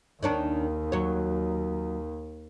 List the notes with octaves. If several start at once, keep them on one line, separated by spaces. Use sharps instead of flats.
D#2 D#3 C#4 D4
F#3 C#5